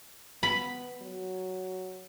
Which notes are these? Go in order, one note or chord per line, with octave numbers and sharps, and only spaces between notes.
B3 B5
F#3